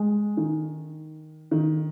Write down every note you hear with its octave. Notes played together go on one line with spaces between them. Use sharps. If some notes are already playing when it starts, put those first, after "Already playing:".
Already playing: G#3
D#3
D#3